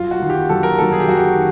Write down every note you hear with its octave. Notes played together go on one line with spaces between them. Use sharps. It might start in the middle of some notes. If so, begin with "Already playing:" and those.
Already playing: F#2 F4
F#4
D#3 F#3
G4
F#2 A4
A#4
D#3 F#3 A4
G#4
G4
F#2 F#4
G4
D#3